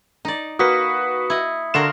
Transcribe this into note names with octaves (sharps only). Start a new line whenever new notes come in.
D#4 D5
A#3 F#4 B4 D#6 B6 C#7
E4 D#5
D3 F4 F#4 A#4 C7 E7